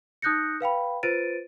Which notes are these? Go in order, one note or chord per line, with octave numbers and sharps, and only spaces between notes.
D#4 D#6 F#6 G6 A#6 C#7
B4 F5 G5 B5
F4 B4 C5 A6 D7 D#7